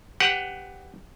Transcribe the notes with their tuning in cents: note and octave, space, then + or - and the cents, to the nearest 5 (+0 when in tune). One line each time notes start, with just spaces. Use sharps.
G4 +0 B4 +20 F#5 +0